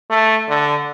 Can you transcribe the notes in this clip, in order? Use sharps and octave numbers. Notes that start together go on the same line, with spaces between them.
A3
D3